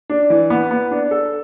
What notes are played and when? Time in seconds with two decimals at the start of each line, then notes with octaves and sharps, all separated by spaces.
0.10 D4
0.30 E3
0.50 B3
0.71 B3
0.91 D4
1.11 A4